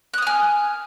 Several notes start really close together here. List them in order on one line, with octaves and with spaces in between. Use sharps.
F#6 D#6 F6 G#5